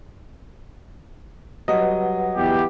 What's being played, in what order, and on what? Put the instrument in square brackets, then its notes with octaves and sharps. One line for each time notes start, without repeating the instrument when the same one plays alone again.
[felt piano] F#3 G3 [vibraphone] B4 F#5 [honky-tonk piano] D#5
[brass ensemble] E2 E3 G4